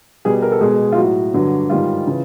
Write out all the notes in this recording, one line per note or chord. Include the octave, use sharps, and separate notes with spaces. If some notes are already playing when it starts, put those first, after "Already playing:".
B2 G3 G#4
A#4
A4
B2 G#3 G#4
F4
A2 F#3 F#4
G2 D3 F#3
G#2 D#3 G3 F4
C#3 E3